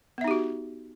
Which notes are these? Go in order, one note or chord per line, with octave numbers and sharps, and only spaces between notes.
B3 D#4 F#4 G4 E5